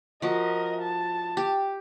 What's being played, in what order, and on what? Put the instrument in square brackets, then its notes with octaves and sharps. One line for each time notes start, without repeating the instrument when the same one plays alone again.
[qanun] F3 F#4 [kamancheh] A#4 D#5
[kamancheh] A5
[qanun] G4